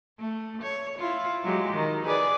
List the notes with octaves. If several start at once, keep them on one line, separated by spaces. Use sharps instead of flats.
A3
C#5
E4 F4
F#3 G#3 G4
D#3
G#4 B4 D5